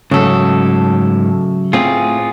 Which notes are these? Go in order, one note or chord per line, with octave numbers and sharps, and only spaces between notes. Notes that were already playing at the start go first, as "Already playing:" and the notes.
G#2 C#3 F#3 A3 A4
A2 C4 F4 G#4